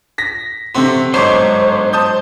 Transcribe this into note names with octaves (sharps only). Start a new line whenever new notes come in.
A#6 B6
C3 A3 C4 F#4 C6
G1 G#2 F#3 C5 C#6 D6
A5 D#6 G6